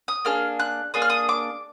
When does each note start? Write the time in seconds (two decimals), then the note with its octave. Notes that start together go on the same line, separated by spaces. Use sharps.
0.08 D#6
0.25 A#3 D4 G#4 F6
0.60 F#6
0.94 A#3 D4 G#4 D#6
1.02 F6
1.10 D#6
1.29 D6